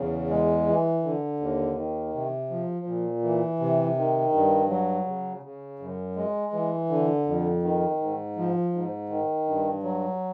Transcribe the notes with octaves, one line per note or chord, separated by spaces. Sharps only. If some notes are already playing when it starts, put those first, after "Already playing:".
Already playing: E2 C#3
G#3
E3
D3
D#2
D#3
C3
F3
A#2
E3
C3
D#3
G2
F#3
C#3
C#3
F#2
G#3
E3
D3
F2
D#3
G#2
F3
G#2
D#3
G2
F#3